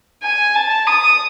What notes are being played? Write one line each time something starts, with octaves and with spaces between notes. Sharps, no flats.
G#5
A5
D#6